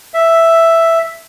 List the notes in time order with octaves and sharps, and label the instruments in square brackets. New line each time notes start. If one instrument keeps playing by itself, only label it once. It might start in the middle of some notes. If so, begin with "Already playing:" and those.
[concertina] E5